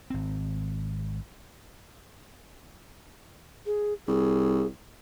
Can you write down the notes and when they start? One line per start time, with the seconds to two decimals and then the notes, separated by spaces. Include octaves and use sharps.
0.10 G#1 C4
3.66 G#4
4.08 C2 G#4